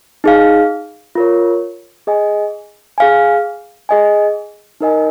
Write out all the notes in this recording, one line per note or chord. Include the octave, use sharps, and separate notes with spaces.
D#4 G#4 F5
F4 A#4 C#5
G#4 D#5 G#5
G#4 F5 G#5
G#4 D#5 G#5
D#4 A#4 D#5 G#5